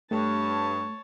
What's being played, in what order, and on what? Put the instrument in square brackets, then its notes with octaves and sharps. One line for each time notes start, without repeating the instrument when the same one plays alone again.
[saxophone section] G2 [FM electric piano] A3 [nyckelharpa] C#5 A5